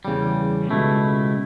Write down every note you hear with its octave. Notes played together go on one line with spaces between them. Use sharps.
E2 C#3 G3
C#2 B2 A3 E4